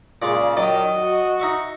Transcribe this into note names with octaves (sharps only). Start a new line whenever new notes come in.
A#2 C#3 G#3 D5
D#3 F#3 D5 D#5
F#4
D#4 E5 C#6